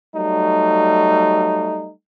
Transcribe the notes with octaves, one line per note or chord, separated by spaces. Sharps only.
F#3 G3 A3 D#4